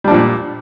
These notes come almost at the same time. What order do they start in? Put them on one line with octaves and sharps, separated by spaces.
G3 D4 F3 A#2